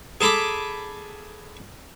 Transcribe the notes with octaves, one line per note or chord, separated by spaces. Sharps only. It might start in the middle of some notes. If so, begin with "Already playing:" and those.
G#4 A4 A#5 B5 D6